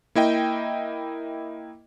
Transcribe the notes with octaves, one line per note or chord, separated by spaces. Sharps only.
A#3 E4 D#5 G5